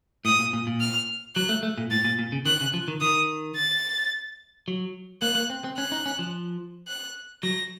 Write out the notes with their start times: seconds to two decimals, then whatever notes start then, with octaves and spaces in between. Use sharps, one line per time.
0.25 A2 D#6
0.39 A#2
0.53 A#2
0.67 A#2
0.80 F6
1.36 F#3 F#6
1.49 A3
1.63 A3
1.78 A#2
1.91 A2 A6
2.05 A#2
2.19 A#2
2.32 C#3
2.46 D#3 F#6
2.61 C#3
2.74 F3
2.88 D#3
3.01 D#3 D#6
3.56 A6
4.68 F#3
5.22 A#3 F#6
5.35 A#3
5.50 C4
5.64 C4
5.78 C#4 F#6
5.92 D#4
6.06 C#4
6.19 F3
6.88 F#6
7.43 F#3 A#6